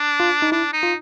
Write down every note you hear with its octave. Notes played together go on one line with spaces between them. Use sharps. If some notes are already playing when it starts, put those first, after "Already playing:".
Already playing: D4
F4
D#4
D4 E4
D#4
F4